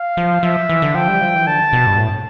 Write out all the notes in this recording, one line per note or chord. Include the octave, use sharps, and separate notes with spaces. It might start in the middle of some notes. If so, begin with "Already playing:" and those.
Already playing: F5
F3
F3 E5
E3
D3
F3 G5
G3
F3
E3
D3 A5
B2
G2
A2